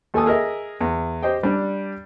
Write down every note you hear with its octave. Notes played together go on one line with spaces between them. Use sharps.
D#2 A4 G#5 A5 D#6
G#4 A#4 D#5 E5
E2
G4 C5 D#5 G5
G3 D4